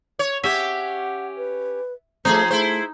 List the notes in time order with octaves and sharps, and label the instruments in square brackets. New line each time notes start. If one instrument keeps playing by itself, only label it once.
[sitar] C#5
[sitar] C#4 G4 [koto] E5 [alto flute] F#5
[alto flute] B4
[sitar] F3 G#4 C5 [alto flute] A3 [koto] D#4
[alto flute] A3 [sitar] E4 C5